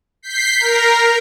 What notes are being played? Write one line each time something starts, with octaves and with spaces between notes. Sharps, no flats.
G6 B6 C7
A#4 A#5